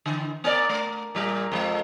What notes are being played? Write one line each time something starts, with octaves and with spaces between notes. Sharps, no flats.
D3 E3
B3 A#4 D5
A3
A#2 G3 A#4
F2 F#3 G#3